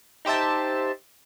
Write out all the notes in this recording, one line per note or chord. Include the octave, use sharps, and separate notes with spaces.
D#4 G4 C5 E5 A5